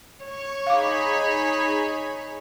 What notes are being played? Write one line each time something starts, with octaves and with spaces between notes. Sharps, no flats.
C#5 C#6
D#4 G#4 F5 B5 D6